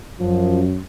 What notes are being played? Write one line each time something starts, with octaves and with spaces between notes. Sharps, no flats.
F#2 F3